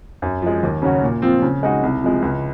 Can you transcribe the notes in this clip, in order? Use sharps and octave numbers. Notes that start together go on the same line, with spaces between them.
F#2
F3 G#3
D#2
C#3 F#3 C#4 F#4
A#2
F3 C4 F4
C#3
G#3 D#4 F#4
C2
C3 F3 G#3
C#2